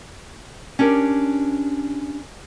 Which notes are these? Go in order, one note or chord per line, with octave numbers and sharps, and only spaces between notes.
C#4 D4 G4 A#4